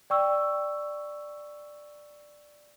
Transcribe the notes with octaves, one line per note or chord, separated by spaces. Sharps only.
D5 G5 C#6 E6